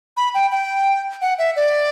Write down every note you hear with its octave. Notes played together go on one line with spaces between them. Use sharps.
B5
G5
G5
F#5
E5
D5